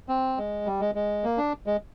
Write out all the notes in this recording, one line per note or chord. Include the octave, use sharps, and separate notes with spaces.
C4
G#3
G3
G#3
G#3
A#3
D4
G#3